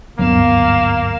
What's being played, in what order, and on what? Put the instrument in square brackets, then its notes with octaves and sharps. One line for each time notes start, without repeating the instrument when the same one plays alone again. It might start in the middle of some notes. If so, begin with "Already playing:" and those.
[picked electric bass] G#1 D2 G2 [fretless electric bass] F#3 B3 [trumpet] A#3 [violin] F5 E7